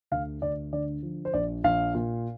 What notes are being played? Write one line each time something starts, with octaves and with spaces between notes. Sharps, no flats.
D2 F5
D2 D5
D3 D5
F3
C5
A#1 D5
A#1 F5
A#2